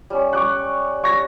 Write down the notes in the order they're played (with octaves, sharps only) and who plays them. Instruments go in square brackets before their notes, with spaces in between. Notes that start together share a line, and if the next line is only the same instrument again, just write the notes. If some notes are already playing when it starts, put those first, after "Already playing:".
[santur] G3 C#4
[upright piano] C#6 D6 F#6
C#6 A#6